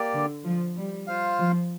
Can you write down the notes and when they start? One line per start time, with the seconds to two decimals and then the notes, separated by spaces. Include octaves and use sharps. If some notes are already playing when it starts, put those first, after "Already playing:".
Already playing: A#3 G4 D5
0.13 D3
0.44 F3
0.76 G3
1.07 F4 C5 F5
1.39 F3